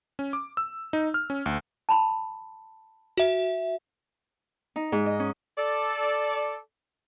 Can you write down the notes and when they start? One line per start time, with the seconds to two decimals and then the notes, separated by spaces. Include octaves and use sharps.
0.19 C#4
0.33 D6
0.57 E6
0.93 D#4
1.14 F6
1.30 C#4
1.46 D2
1.89 A5 B5 C6
3.17 F#4 E5
4.76 D#4
4.92 G#2
5.06 D#5
5.20 C#4
5.58 A4 D5